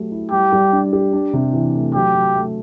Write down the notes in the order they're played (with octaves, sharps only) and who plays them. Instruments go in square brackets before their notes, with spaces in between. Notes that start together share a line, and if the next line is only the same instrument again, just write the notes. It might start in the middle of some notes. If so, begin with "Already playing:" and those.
Already playing: [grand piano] F#3 A3 G4
E4
[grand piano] G3 [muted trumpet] G4
[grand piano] G3
D4
G4
D4
C3
E3
A3
[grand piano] F#3 [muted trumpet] G4
[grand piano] F#3
A3